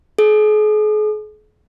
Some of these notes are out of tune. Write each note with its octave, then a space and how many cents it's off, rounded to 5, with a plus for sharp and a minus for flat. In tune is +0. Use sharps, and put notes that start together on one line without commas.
G#4 +40